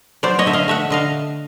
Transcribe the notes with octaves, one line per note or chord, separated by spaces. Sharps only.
F#3 C5 D5
C#5 D#5
D3 E5
D#5 F5
A3 E5 F#5
D3 D#5 F5